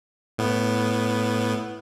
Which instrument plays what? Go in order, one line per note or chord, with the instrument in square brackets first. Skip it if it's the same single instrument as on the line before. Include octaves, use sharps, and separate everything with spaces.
[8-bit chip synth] A2 B3